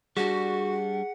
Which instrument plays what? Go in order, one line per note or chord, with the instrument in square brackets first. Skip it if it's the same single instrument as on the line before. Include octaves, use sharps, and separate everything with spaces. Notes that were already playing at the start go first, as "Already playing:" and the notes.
[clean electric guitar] G3 D4 [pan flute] F#4 [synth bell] G#4 [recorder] F#5